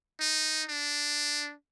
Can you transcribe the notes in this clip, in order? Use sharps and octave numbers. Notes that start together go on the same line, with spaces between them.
D#4
D4